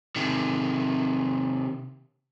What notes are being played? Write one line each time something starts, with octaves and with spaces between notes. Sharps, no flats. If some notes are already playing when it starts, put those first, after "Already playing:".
C3 D#3